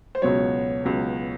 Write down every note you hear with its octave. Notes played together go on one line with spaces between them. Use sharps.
C5
C#2 B2 F#3 C#5
C#2 B2 F#3